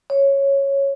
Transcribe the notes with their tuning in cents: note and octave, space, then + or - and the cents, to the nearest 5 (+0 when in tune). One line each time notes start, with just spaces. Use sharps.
C#5 -5